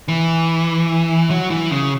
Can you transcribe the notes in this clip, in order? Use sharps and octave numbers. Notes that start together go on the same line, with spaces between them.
E3
F#3
E3
C#3